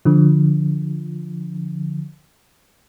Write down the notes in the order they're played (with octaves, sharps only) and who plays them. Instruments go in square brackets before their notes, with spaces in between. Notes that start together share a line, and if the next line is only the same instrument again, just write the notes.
[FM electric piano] D3 F3